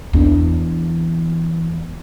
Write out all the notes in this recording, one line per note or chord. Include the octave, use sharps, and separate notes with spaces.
E2 D4